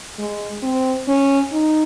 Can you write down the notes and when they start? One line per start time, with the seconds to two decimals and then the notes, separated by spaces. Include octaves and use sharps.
0.19 G#3
0.63 C4
1.08 C#4
1.52 D#4